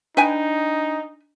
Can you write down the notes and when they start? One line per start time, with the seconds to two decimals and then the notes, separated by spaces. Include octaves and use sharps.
0.17 D4 D#4 B4 G5 G#5